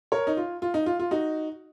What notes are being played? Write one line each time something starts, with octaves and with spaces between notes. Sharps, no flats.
A#4 C#5
D#4
F4
F4
D#4
F4
F4
D#4 F#4